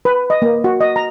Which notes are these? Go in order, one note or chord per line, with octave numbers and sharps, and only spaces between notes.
B4
D#5
A#3
F#4
D#5
A#5